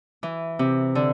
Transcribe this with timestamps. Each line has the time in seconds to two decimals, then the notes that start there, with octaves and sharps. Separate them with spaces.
0.23 E3
0.59 C3
0.95 D3